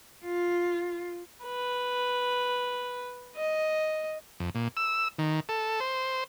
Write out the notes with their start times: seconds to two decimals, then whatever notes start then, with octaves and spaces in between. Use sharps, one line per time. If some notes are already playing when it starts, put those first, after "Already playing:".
0.24 F4
1.44 B4
3.35 D#5
4.40 F2
4.55 A#2
4.77 E6
5.19 D#3
5.49 A4
5.80 C5